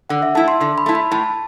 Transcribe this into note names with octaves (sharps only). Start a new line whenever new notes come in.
D3 F#5
E5
A3 E4 A5
C6
D3 C6
B5
A3 E4 A5
B5
A2 A5